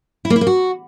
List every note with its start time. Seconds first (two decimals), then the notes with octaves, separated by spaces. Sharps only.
0.25 E4
0.30 A#3
0.36 E4
0.41 A#3
0.47 F#4